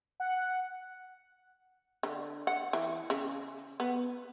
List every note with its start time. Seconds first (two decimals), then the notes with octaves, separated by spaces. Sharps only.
0.20 F#5
2.03 D3
2.47 F#5
2.73 E3
3.10 C#3
3.80 B3